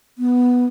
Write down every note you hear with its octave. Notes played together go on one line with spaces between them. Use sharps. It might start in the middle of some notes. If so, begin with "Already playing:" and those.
B3